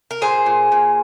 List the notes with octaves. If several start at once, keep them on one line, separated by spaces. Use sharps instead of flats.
A#4
A#2 G#4 C5
A#2
A#2